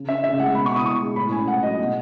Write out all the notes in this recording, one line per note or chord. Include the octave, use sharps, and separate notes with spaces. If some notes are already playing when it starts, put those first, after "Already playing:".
Already playing: C#3
C#4 E5
C#3 E5
G#3 F#5
B2 B5
C#6
B3
D#6
B2 C#6
G#3
A2 B5
C#4 G#5
A2 F#5
F#3 D#5
B2